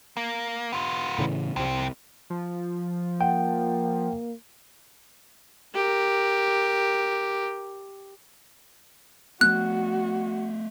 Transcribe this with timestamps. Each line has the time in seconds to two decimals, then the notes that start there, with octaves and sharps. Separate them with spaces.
0.17 A#3
0.73 B3 F4
1.19 A2 C#3 E3
1.56 C2 F2 C3 C4
2.30 F3
3.21 A#3 F#5 G5
5.75 G4 A#4
9.41 F3 A3 B3 F#4 F#6